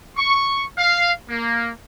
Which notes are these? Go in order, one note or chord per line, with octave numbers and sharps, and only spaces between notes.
C#6
F5
A#3